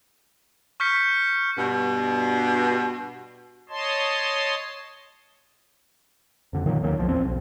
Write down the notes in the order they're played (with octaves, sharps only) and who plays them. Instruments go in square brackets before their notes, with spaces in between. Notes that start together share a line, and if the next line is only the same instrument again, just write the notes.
[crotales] C#6 F6 G6 B6 C#7
[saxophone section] G2 B2
[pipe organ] C#5 D#5 A5 C6
[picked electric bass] F2 D3
E2 A#2 D#3 F#3
D#2 D#3 F#3 A#3
B1 E2 F3
A1 E2 C4
B1